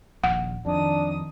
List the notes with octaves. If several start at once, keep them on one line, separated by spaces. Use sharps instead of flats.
D#1 A#1 F#5
F2 D#3 D4 D#6